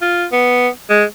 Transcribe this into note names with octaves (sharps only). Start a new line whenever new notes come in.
F4
B3
G#3